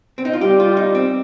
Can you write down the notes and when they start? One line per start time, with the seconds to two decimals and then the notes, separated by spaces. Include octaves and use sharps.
0.18 C4
0.25 D#4
0.33 F4
0.41 G3 G4
0.60 F4
0.77 D#4
0.95 C4